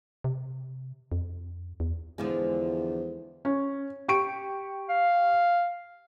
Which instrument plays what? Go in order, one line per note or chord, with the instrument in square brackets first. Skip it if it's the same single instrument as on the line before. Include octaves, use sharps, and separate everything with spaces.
[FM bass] C3
F2
E2
[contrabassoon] E2 [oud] D3 F3 G#3
[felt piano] C#4
G4 C#6 D7
[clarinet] F5